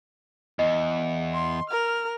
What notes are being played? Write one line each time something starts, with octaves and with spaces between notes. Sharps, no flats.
E2 D#5
C6
A#4 F6